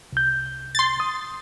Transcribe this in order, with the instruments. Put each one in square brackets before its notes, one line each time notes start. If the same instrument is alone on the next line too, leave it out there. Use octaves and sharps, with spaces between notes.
[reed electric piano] C2 G6
[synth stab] C6 A6
[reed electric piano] D#6